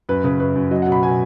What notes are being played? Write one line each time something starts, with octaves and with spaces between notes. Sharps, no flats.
F#2 B4
C#3 B4
F#2 B4
F#2
F#3 D#5
B2 F#5
B5
B2 G#5